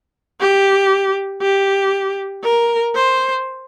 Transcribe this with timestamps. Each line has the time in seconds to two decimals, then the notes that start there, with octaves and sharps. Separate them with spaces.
0.40 G4
1.42 G4
2.44 A#4
2.95 C5